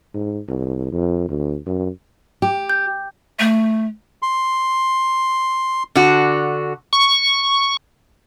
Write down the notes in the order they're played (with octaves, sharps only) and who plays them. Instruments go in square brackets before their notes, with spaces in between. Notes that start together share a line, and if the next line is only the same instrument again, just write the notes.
[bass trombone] G#2
C2
F2
D2
F#2
[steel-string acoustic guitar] G4
[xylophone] G6
[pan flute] A3
[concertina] C6
[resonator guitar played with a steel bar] D3 F#4
[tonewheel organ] C#6